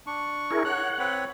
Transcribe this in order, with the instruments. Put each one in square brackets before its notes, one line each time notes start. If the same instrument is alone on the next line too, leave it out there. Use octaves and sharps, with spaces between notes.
[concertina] D4 C#6
[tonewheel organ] E4 G#4 A#4
[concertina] C#5 F#6 [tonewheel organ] F#5
[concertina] C4 B4 C#5